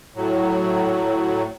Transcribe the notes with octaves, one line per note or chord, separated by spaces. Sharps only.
A2 F#3